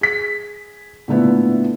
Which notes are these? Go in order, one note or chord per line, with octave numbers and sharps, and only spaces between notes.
G#4 B6
A#2 D3 A3 B3 E4